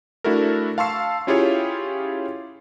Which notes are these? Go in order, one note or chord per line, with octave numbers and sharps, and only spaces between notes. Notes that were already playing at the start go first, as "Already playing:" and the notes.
A3 D4 E4 F#4 A4 A#4
F5 A5 C6 C#6 E6 C7
C#4 E4 F4 G4 G#4 C#5